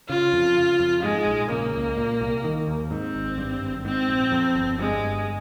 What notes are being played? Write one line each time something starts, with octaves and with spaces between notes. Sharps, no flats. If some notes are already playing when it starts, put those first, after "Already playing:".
C#3 F4
F2
C#3
F2
G#2 G#3
A#1
C#3 A#3
C#2
A#2
C2
D#3
D#2
G#2 C4
G#1
G2
G#1
G#2 C4
A#1
F2
G1
G2 G#3
G1